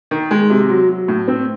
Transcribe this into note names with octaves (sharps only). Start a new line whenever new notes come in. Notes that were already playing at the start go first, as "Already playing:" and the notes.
D#3
G#3
C3
F#3
F#3
A2
C4